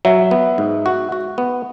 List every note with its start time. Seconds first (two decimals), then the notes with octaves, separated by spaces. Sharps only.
0.05 F#3 E5
0.31 B3
0.58 G#2
0.86 F#4
1.12 F#4
1.38 B3